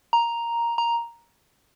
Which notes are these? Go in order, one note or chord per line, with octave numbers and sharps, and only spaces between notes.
A#5
A#5